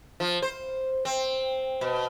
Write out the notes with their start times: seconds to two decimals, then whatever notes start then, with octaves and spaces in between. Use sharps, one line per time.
0.20 F3
0.42 C5
1.05 C4
1.81 B2